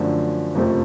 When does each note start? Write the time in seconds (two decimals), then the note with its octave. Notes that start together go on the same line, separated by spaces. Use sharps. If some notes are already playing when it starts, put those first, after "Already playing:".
Already playing: F#2 D3 F3 A3
0.55 F#1 F2 C3 F3 A3